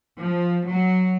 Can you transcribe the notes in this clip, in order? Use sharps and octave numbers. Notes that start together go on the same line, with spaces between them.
F3
F#3